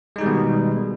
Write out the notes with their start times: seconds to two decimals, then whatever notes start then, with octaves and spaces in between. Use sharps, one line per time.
0.16 G#3
0.18 D#4
0.21 G3
0.24 D#3
0.26 B2